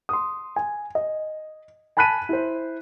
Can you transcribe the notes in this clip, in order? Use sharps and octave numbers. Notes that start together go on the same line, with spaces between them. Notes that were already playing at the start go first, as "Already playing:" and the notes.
C6 D#6
G#5
D#5
G#5 A5 B5 F#6 B6 D#7
E4 C5